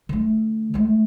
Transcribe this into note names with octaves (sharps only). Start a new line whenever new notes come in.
D3 A3
G#3 A3